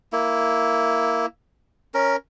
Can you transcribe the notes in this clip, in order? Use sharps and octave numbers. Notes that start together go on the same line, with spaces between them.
A#3 E4
C#4 A#4